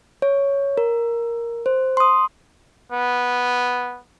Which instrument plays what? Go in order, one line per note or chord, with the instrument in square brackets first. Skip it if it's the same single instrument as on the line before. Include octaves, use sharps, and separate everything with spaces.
[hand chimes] C#5
A#4
C5
C6 D#6
[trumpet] B3